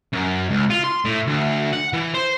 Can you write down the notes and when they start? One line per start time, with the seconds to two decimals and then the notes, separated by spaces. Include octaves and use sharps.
0.13 F#2
0.49 C#2
0.70 F4
0.84 C6
1.05 A2
1.27 D2
1.73 F#5
1.93 E3
2.14 C5